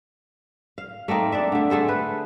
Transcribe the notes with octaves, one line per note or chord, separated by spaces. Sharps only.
F5
A3 A#3 C4 D#4
D4 D5 E5
D3 A3
A3 G#4 A4 C5
B4